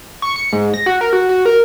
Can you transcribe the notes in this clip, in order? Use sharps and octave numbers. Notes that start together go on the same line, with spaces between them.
C#6
C#7
G#2
A#6
F#4
A#4
F#4
F#4
A#4